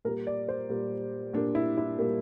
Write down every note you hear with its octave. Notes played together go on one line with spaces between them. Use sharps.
A#2 G3 A#3 A#4
D5
C5
A#2 G3 A#3
A#2 G3 A#3 D4
E4
E4
A#2 G3 A#3